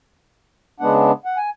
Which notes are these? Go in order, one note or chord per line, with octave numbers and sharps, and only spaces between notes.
C#3 G#3 B3 D4 F#5
F#5
G#5